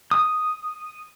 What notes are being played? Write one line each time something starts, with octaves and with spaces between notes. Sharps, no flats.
D#6